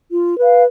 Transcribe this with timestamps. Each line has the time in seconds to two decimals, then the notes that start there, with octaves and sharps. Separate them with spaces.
0.11 F4
0.37 B4 F5